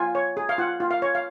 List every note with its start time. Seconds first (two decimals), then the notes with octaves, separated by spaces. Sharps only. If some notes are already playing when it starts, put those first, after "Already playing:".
Already playing: F4 G#5
0.15 C#5
0.37 G#4
0.49 F5
0.58 F4 F#5
0.80 F4
0.91 F5
1.02 C#5
1.15 F5